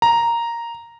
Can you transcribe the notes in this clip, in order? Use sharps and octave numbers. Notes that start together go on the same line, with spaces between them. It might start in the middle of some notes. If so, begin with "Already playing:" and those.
A#5